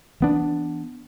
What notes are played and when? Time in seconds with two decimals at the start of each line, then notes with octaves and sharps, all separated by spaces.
0.20 E3 B3 D4